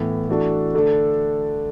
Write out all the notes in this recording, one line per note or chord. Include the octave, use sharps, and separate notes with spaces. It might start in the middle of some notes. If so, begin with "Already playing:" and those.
Already playing: A2 E3 B3
E3 A3 D4 F#4 A4
D3 A3 D4 A4